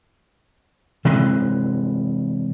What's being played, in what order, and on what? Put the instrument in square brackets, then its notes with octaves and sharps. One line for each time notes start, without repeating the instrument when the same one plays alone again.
[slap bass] C3 E3 G#3